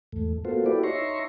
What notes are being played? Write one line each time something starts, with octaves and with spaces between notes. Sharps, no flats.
E2 G#2 A3
A#3 B3 F4 F#4 A4 C5
E4 F#4 G4 A4 B4 D5
D#4 C#5 E5 A#5 C6 C#6